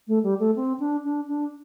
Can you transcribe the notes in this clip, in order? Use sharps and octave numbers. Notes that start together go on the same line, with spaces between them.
A3
G3
A3
C4
D4
D4
D4